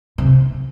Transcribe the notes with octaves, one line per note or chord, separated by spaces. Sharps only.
C3